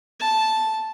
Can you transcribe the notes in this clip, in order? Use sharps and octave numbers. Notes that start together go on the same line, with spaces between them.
A5